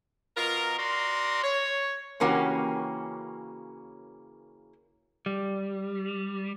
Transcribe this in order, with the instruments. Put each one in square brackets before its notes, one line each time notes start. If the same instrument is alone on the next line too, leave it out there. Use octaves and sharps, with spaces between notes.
[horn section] B2 F4 A#4
F#4 A#4 D5 A#5 C6
C#5
[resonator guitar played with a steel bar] C#3 E3 A#3 C#4 F#4 G4
[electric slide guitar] G3